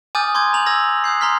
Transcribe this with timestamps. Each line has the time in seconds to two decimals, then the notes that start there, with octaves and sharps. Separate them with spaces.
0.15 G#5 D6 D#6 F6 G6 A6
0.34 A#5 C6 D6 G6 G#6
0.53 A#5 G6 F7 F#7
0.66 D6 E6 G#6 A#6
1.04 D#6 F#6 G6 C7
1.21 A#5 C6 F6 B6